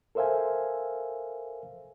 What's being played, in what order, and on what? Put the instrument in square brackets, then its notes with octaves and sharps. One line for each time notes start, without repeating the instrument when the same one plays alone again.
[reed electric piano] A4 A#4 C5 E5 F5 G#5